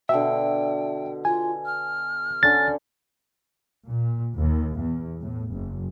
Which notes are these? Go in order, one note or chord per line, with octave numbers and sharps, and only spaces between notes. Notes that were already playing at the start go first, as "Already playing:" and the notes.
B2 D3 E5 G5
F4 G#5
F6
D3 C#4 A6
A#2
D#2
E2
A2
F#1